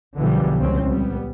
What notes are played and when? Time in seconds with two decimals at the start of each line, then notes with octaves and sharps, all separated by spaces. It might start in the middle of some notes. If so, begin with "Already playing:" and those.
0.15 B1 D3 E3 F3 G3
0.59 C#2 A#2 C4 C#4
0.88 G3 B3